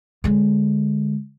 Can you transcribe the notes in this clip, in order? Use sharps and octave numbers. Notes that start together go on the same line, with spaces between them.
D3 G#3